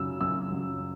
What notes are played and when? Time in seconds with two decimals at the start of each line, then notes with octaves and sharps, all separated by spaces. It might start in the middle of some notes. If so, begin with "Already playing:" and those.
Already playing: F#2 C#3 F#3 E6
0.21 F#2 E6
0.52 C#3 F#3